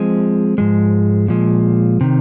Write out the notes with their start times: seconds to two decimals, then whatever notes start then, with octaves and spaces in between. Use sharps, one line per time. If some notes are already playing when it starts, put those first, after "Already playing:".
Already playing: F3 G#3 C4
0.58 G#2 F3 G#3
1.28 A#2 F3 G#3
2.01 C3 D#3